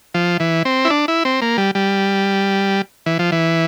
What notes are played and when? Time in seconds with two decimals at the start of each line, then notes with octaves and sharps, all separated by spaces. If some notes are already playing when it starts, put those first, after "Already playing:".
0.14 F3
0.40 E3
0.65 C4
0.85 E4
0.90 D4
1.08 E4
1.25 C4
1.42 A#3
1.58 G3
1.75 G3
3.06 E3
3.19 F3
3.32 E3